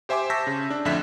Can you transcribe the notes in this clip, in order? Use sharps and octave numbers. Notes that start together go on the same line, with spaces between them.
G4 C5 E5 G#5 C6 D6
A5 C#6 E6 G6 A#6 B6
C#3
D4
F2 A2 D3 E5 F#6 B6